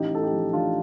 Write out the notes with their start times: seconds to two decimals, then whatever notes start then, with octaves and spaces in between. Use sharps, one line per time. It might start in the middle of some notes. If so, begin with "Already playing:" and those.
Already playing: A1 D#4 G4
0.12 A2 A4
0.22 D#4 G4
0.33 F3
0.53 A1 D4 F4